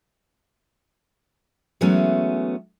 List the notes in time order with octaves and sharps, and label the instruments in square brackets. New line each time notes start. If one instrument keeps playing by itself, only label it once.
[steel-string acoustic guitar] E3 F#3 G#3 A3 B3 C#4